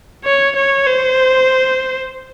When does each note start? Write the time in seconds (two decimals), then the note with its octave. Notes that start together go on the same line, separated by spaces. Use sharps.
0.25 C#5
0.56 C#5
0.87 C5